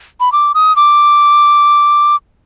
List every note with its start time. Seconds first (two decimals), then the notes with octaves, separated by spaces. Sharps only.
0.20 B5
0.32 D6
0.55 D#6
0.76 D6